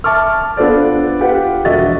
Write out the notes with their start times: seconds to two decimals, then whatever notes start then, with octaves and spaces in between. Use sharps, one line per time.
0.04 E5 A5 C#6 D6 F6
0.57 B3 D4 F4 A4 C5 D5
1.21 F4 G4 B4 F#5
1.65 E1 F3 F#4 D#5 E5 A6